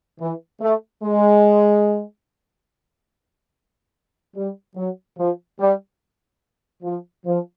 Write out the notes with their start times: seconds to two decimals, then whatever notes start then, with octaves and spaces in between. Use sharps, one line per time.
0.19 E3
0.61 A3
1.03 G#3
4.35 G3
4.76 F#3
5.17 F3
5.59 G3
6.83 F3
7.26 F3